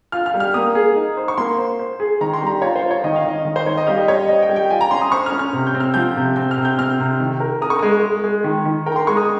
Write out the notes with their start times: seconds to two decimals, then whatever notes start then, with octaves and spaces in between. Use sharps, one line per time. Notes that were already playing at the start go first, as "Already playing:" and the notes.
0.12 F4 F6
0.26 F6
0.34 G3
0.40 F6
0.54 A#3 D#6
0.75 G#4
0.96 D#4
1.17 C5
1.28 C#6
1.38 A#3 C6
1.58 C5
1.79 C5
2.00 G#4
2.21 D#3 A#5
2.34 C6
2.41 G3
2.47 A#5
2.62 F4 C#5
2.76 C5
2.83 F4
2.91 C#5
3.04 D#3 D#5
3.16 F5
3.25 D#3 D#5
3.45 D#3
3.56 C5
3.66 D#3 C#5
3.77 D#5
3.87 G3 F5
3.98 D#5
4.08 G3 C#5
4.18 D#5
4.28 C5 D#5
4.42 G5
4.49 G3
4.56 G5
4.70 F4 G#5
4.81 A#5
4.91 C#4 C6
5.02 D#6
5.12 C5 C#6
5.26 F6
5.32 C#4
5.39 F6
5.53 C3
5.67 G6
5.74 C4
5.80 F6
5.94 F3 G6
6.16 C3
6.36 C4 G6
6.51 F6
6.57 C3
6.65 G6
6.78 C4 F6
6.99 C3
7.20 D#3
7.40 A#4
7.61 A#4 D#6
7.70 C#6
7.79 G#3 D#6
8.03 G#3
8.24 G#3
8.44 D#3
8.65 D#3
8.86 A#4 G5
8.92 A#5
8.96 C6
9.07 G#3 C#6
9.17 D#6